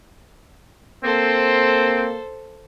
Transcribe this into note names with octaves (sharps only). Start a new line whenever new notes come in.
A#3 C4 A4 C5